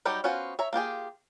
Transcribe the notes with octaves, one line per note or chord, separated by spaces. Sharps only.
F#3 G3 D#4 G4
B3 C#4 F4 F#4 C5
C#5 E5 A#5
A#3 F4 G4 G#4